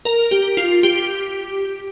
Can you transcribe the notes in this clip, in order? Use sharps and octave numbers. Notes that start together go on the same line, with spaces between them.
A#4
G4
F4
G4